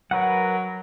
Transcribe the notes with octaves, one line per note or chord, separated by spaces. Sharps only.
F#3 A#4 B4 F#5